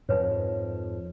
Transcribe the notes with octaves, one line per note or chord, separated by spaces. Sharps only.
F2 G#2 B4 C#5